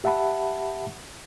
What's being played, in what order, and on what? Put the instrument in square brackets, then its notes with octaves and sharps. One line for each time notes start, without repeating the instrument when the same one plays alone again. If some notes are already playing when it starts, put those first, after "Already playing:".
[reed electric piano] G4 E5 F#5 A5 B5